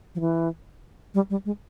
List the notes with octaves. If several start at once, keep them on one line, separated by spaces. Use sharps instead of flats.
F3
E3
G3
G3
G#3